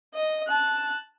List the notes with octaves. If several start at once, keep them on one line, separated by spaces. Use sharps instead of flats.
D#5
A5 F#6